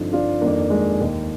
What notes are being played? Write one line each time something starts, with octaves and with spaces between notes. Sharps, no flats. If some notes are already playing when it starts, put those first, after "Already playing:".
Already playing: G2 D3 F3 C4 D#4
D4 F4
F2 D#3 A#3 D4
G#3
D#2 D#3